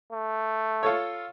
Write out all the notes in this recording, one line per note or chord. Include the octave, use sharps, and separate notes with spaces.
A3
F4 A4 C#5